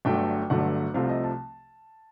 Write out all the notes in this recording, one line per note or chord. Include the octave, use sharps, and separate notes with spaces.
G1 G2 D3 F#3 A3 G5
G1 G2 D3 F#3 A3 F#5
C2 C3 F3 A3 C4 F5
D#5
A5